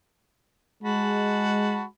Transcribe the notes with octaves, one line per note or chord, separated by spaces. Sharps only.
G#3 F#4 A5 B5